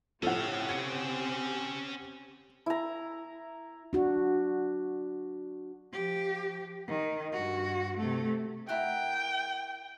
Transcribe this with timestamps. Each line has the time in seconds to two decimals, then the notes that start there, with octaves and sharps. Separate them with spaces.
0.23 A2 F3 C4 C#4 G4 A4 F5 F#5
0.69 G#6 C#7
2.66 E4 A#5
3.93 D4 F#4
5.93 F3 G4
6.87 D#3
7.32 G2 F#4
7.98 C3 A3
8.69 E4 A#4 F#5 G5